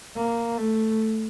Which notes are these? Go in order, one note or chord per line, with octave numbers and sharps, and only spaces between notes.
A#3
A3